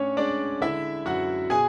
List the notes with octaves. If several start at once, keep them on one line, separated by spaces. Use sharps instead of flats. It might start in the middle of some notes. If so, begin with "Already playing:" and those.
Already playing: A2 C#4 D4 C#5
G#3 D4 D5
D3 E4 E5
F#2 F#4 F#5
B2 G#4 G#5